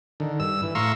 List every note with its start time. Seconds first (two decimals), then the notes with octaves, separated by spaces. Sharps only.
0.20 D3 D#3
0.40 G2 E6
0.62 E3
0.75 A2 F5 A#5 C6 C#6 E6